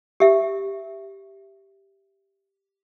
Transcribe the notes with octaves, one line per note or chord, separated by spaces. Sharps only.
G4 E5